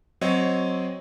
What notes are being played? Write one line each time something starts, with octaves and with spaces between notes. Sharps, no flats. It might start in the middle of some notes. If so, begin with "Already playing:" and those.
F#3 C4 C#5 D#5